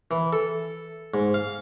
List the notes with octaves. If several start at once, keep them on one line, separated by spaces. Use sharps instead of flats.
E3
A4
G#2
F5